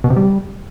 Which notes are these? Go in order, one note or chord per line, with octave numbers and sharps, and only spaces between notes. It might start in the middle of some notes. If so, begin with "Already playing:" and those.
B2
C3
G3